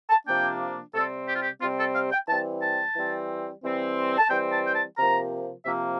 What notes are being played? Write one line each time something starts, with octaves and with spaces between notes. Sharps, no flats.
A5
C3 F3 A#3 D4 G5
C3 G3 C4 A4
G4
F4
G4
C3 G3 C4 F4
A4
F5
G5
E3 G3 C4 A5
A5
E3 G3 C4
E3 G3 C4
A5
E3 G3 C4 G5
A5
G5
A5
C3 F3 A#3 A#5
C3 F3 A#3 E5